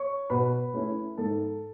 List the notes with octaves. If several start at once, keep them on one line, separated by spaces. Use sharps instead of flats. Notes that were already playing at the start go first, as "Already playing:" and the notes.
Already playing: C#5 C#6
B2 B4 B5
A3 C#4 E4
G#2 A4 A5